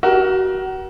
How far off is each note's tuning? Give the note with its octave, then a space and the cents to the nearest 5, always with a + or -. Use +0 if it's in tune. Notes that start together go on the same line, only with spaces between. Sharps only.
F#4 +30 A#4 +30